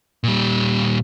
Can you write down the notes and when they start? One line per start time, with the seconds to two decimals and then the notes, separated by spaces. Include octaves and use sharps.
0.24 A#2 G3